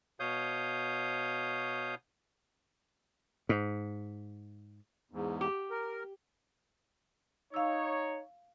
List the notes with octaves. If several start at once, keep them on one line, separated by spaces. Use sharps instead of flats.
B2 C#5 F5 D#6 G6
G#2
E2 G#2
G4
A#4
D#4 C#5 F5 E6